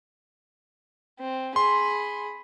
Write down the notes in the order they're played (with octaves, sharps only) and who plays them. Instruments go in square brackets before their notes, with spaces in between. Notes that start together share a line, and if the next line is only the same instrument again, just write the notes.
[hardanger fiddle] C4
[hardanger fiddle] G#4 B5 [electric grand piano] C6